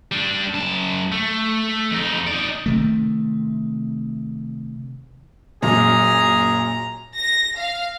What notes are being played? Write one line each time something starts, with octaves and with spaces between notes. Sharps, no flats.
G3 D4
F#2 A5
A3
F2 D#4
D#4 D5
C3 D#3 A3
F#2 A#2 G#4 A#5
A#6
F5